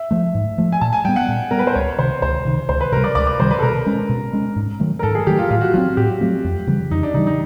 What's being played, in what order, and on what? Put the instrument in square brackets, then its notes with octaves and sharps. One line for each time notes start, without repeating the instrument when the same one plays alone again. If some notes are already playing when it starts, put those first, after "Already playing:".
Already playing: [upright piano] E5
[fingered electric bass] F3 A3
G#2
F3 A3
[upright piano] G#5
[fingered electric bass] A#2 [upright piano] A5
[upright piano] G#5
[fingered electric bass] G3 B3 [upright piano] G5
[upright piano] F#5
[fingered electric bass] A#2
[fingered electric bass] G3 B3 [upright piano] A#4
[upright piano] B4
C5
[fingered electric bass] C#2 [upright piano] C#5
[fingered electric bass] C3 D#3 [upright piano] C5
[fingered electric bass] C#2 [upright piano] C5
[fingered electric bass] C3 D#3
[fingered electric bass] C#2 [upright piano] C5
[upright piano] B4
[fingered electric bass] C3 D#3 [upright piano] A#4
[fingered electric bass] G3
[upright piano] D5
[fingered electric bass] C#2 [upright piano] D5
[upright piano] D5
[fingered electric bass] C3 D#3 G3 [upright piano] C5
[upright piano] B4
A4
[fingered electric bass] B2 [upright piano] A#4
[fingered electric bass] G#3 C#4
B2
G#3 C#4
G#2
D#3 F#3 A3
[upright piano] A#4
[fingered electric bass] G#2 [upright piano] A4
[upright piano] G#4
[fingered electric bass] D#3 F#3 A3 [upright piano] G4
[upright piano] F4
[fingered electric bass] A2 [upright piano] F4
[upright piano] F#4
[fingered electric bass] F#3 A3 C4 [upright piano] F4
[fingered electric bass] A2 [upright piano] G4
[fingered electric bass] F#3 A3 C4
F2
C#3 E3 G3
[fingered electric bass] F2 [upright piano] D#4
[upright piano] D4
[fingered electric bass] C#3 E3 G3 [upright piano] D#4
[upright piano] D#4